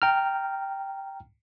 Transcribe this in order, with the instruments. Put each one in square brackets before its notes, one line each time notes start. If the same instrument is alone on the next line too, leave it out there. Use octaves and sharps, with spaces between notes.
[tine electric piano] G5 A#5 F6